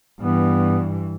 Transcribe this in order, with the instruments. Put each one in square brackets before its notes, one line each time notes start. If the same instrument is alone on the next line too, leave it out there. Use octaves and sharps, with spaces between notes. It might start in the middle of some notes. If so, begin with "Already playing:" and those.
[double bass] G2 E3 [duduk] B3